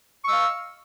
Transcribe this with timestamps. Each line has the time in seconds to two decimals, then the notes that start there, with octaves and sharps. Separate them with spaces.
0.24 C#6
0.27 E6
0.29 D#5
0.32 F5